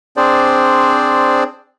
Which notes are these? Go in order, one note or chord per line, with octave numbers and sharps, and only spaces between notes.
C4 D4 G#4 C5 D5